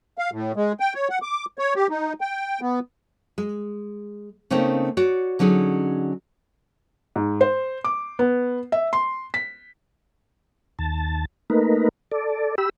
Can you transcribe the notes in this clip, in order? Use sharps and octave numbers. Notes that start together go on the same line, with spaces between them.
F5
A2
G#3
G5
C#5
F#5
D6
C#5
G4
D#4
G5
B3
G#3
C#3 A3 A#3 C4 C#4 D#4
F#4 C#5 D5
D3 F#3 C#4 D#4 G#4
G#2
C5
D6
B3
E5
C6
B6
D#2 A5
A3 A#3 D#4 A#4 B4
A4 D5
G4 B5 E6